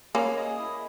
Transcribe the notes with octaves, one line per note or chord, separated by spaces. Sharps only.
A#3 C#4 G#4
D#5
E4